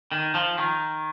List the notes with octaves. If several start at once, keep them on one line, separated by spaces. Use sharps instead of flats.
D#3
F3
D#3